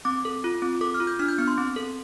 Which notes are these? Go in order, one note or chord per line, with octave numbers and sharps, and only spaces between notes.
C4 D6
A4
F4
C4
A4 D6
F6
F4
G6
D4 F6
G6
B3 F6
C6
C4
A4